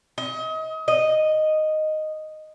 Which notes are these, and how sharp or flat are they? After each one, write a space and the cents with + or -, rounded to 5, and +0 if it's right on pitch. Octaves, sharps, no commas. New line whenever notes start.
D#5 +35
D#5 -5